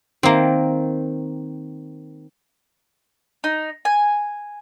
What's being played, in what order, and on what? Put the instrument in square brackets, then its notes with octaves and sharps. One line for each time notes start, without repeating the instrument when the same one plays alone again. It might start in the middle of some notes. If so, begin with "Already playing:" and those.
[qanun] D#3 [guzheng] A#3 C4
[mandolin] D#4
G#5